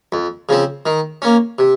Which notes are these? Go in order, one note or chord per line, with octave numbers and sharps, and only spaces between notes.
F2
C#3 F3 C4
D#3
A#3 C#4
C3